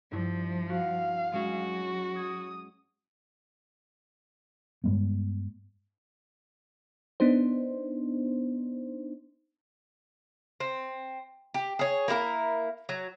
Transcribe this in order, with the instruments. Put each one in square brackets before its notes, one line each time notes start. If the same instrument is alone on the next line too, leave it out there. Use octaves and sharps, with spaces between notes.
[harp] G2 D4 E4 [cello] F3
[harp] F#4 F#5 [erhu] F5
[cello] F#3 F#4 [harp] G#3 C#4
[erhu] D#6 [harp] G#6
[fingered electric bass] G2 G3 G#3 B3
[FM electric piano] B3 D4 D#4 C5
[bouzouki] C4
G4
G#4 C#5
A#3 E4 F#4 A#4
F#3